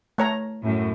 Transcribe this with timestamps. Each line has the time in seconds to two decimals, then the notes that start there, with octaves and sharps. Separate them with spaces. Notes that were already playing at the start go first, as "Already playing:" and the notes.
0.18 A3 C#5 A#5
0.63 F#2 A2